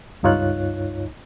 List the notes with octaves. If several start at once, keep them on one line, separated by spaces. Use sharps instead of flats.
C#2 G2 D#4 F4 C#5 F#6